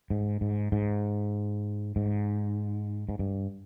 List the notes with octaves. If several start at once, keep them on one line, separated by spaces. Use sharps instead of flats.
G#2
G#2
G#2
G#2
G#2
G2